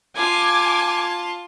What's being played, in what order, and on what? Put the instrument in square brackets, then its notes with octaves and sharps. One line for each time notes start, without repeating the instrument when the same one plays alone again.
[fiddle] F4 A5 [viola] G#5 D6